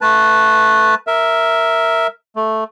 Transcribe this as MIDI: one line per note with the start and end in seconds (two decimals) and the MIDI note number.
0.01 0.95 57
0.01 0.95 71
0.01 0.95 81
1.07 2.07 70
1.07 2.07 76
2.36 2.64 57